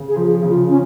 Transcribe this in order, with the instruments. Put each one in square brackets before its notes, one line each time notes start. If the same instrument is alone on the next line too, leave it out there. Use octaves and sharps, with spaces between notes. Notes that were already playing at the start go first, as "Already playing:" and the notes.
Already playing: [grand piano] C#3
[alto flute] G#4
[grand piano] F3
[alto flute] G#4
[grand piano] C#3
[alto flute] F4
[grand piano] F3 [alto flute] C#4